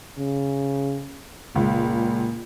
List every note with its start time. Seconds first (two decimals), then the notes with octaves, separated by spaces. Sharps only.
0.17 C#3
1.55 C#2 A#2